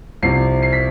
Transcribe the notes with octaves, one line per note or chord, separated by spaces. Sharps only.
C2 C3 F3 C7
C7
B6